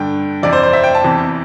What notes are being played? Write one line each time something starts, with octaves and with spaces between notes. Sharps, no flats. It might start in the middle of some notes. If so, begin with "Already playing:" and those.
Already playing: G2 D3 G5
F2 C3 E3 D5
C5
C5
E5
G5
A5
E2 C3 E3